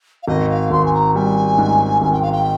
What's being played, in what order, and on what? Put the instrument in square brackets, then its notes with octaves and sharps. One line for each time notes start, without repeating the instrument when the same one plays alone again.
[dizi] F5
[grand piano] G#1 [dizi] D#5
[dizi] F5
[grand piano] G#1 [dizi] C6
[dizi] G#5
A#5
[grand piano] G3 [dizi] G#5
[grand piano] G#2
[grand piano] G#1 [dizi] G#5
[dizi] G5
F5
G5